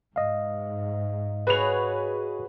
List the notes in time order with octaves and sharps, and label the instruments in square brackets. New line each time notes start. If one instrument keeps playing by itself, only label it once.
[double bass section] G#2 [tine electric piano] D#5 F5
[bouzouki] F#4 G#4 C#5 [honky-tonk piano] B4 F7